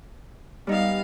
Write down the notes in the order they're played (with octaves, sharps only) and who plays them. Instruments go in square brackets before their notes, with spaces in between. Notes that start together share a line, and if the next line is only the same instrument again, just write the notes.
[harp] G3 D#4 [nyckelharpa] B3 F5